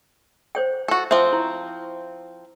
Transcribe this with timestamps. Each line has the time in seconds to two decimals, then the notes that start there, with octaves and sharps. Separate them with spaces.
0.55 C5 C#5 G5
0.88 F#4 A4
1.11 F3 C4 C5 E5
1.33 E4